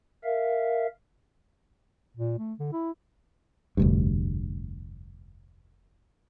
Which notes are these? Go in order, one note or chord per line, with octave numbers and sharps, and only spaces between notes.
A#4 E5 F5
A#2
A3
D3
E4
F1 D2 G2